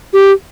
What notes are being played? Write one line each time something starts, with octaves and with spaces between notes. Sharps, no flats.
G4